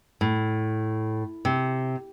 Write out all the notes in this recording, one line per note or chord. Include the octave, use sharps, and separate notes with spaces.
A2
C3